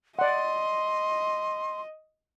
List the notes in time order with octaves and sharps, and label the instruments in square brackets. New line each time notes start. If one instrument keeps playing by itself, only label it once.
[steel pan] D5 F#5 [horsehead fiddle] D#5 [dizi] C6